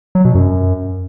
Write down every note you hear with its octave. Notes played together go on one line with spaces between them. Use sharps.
F#3
B2
F#2